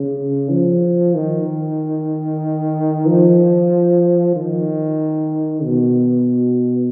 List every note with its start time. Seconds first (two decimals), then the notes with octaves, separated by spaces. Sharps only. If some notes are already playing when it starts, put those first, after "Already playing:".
Already playing: C#3
0.50 F3
1.14 D#3
3.07 F3
4.36 D#3
5.65 B2